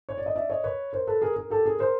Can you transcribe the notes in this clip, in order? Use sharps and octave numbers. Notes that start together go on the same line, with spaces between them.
C#5
D5
D#5
D5 E5
C#5 D#5
B4 C#5
A#4 C5
A4 B4
G#4 A#4
G#4 A#4
G4 A4
G#4 A#4
A#4 C5